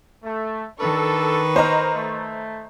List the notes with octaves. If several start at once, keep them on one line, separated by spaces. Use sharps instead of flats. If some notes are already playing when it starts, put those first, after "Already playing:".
A3
D#3 D4 A4 B4 C#6
A#4 C5 D#5 A#5
A3